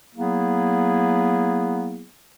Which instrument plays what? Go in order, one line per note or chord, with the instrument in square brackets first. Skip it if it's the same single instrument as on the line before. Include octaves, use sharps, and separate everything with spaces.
[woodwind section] F#3 A#3 B3 E4 G#4